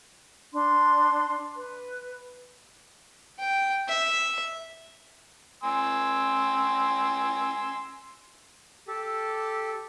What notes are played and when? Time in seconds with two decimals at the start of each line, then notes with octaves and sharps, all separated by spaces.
0.53 D4 C6
1.57 B4
3.39 G5
3.88 E5
5.64 G#5 C6 E6
8.88 G4 A4 E6